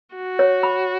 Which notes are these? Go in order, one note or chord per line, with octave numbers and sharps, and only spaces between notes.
F#4
C#5
B5